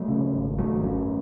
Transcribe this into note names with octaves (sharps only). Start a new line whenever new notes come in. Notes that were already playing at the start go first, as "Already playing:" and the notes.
Already playing: F#3 A3
C#3
G#1
G#1 F#3 A3
F#2